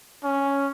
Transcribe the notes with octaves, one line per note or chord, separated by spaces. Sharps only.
C#4